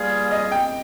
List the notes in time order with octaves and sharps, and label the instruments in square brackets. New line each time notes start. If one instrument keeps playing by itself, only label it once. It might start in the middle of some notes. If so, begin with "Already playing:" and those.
Already playing: [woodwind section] G2 G3 A#3 F4 G#4
[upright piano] D#5
G5